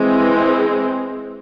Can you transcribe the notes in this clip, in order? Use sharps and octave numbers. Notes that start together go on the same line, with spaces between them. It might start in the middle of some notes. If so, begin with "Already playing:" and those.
Already playing: E3 G#3 C4